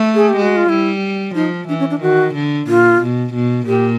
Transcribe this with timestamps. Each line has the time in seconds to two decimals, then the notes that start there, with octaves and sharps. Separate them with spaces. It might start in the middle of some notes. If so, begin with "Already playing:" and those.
Already playing: A3
0.15 G#4
0.29 G4
0.37 G#3
0.42 F#4
0.56 F4
0.69 G3 E4
1.35 F3 D#4
1.68 E3 D4
1.79 C#4
1.90 D4
2.01 D#3 F#4
2.34 D3
2.67 A#2 F4
3.01 B2
3.34 B2
3.66 A#2 G4